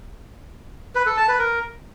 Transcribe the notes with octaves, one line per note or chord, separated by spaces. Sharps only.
B4
A4
A5
B4
A#4